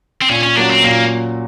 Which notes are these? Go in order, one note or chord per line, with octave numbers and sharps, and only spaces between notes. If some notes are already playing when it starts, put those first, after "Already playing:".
C4
A#2 C#4
C#4
F#3 A#3 C#4 D4 F#4
C4
A#2 A#3